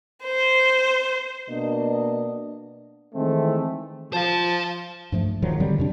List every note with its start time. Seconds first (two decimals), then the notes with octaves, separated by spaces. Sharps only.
0.24 C5
1.48 B2 A#3 D4 D#5
3.14 D#3 E3 G#3 A3 C4
4.13 F3 C5 F5 A5
5.12 G2 F3 A3
5.42 G#2 D#3 F3 F#3
5.60 D3 D#3 G3 C4
5.78 F2 C3 D4